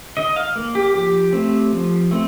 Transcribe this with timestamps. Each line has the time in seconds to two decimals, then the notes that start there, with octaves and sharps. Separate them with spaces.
0.17 D#3 D#5
0.36 F5
0.56 A#3
0.75 G4
0.94 F3 G4
1.33 A3 C4
1.72 F3
2.11 A3 C4